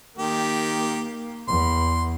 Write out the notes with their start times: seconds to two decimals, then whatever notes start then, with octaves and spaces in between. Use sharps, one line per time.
0.18 D#3 A#3 G4
1.48 E2 C6